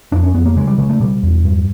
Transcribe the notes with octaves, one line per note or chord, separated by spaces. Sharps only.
F2 D4
C#4
F2 B3
A#3
C#3 G#3
G3
C#3 G#3
A3
B2 G3
E2
G2